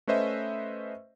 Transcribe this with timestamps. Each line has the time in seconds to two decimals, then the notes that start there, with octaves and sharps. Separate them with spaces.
0.07 A3 C#4 B4 C5 D#5 E5